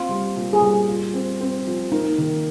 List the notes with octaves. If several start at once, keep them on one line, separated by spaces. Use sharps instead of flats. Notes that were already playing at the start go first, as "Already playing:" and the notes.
Already playing: C4 F4
G3
A#2
G#4
G3
F4
C4
C4
F3
A#3 D#4
D#3